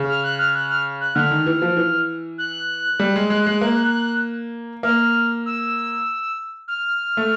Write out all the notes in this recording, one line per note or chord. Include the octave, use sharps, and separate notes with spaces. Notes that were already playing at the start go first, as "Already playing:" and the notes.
Already playing: C#3
F6
F#6
F6
F#6
F6
F#6
D3 F6
D#3
E3
F3
E3
F#6
G3
G#3
G#3
G#3
A#3
A#3 F6
E6
F6
A3